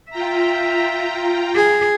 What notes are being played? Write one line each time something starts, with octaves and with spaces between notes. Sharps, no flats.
F4 E5 G5 A#5
G#4